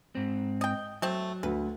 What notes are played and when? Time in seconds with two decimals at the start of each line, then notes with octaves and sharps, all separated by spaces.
0.15 G#2 C4
0.61 D#5 G5
1.02 F#3 A3 C4
1.43 D2 B4